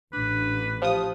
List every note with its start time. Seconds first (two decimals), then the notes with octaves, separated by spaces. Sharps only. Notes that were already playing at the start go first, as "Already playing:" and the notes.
0.13 A1 D4 B4
0.82 F3 G4 F5 D#6